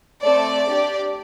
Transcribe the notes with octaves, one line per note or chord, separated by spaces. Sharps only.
A3 C4 A4 D5
D4 G4